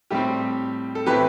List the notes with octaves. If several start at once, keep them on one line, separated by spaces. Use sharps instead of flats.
A2 G3 C4 G4
A4
A2 E3 A3 C4 G4 B4